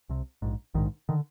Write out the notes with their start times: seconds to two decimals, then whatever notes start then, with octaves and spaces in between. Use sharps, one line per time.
0.09 C2 C3
0.42 A#1 G#2
0.74 A#1 G#2 D#3
1.09 D3 D#3